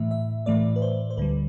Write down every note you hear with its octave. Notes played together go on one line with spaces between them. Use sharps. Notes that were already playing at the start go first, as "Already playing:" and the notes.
Already playing: A2 E3 A3 E5
E5
A2 E3 A3 D5
B4
C5
C5
D2 D3 G3 B4